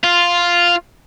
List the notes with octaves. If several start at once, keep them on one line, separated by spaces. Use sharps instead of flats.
F4